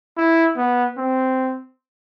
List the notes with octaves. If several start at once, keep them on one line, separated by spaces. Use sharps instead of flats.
E4
B3
C4